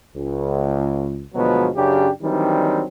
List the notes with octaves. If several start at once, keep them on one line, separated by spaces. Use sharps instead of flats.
C#2
D2 B2 F3 F#3 G#3 B3
F#2 C#3 D4 G4
D#3 E3 F#3 G3 C4 D4